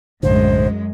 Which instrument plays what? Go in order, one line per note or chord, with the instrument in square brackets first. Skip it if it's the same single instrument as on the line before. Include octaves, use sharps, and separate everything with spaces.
[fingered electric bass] B1 A2 D3 [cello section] F#2 G#3 [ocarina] C5